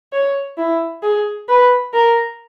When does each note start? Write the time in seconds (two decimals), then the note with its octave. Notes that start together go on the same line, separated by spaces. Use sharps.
0.13 C#5
0.58 E4
1.03 G#4
1.48 B4
1.93 A#4